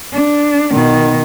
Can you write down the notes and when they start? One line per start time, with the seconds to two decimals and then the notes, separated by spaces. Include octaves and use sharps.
0.13 D4
0.73 B2 D#3